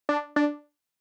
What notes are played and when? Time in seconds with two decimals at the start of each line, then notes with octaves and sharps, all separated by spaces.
0.09 D4
0.36 D4